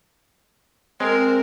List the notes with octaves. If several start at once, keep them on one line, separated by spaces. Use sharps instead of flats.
G#3 C4 A#4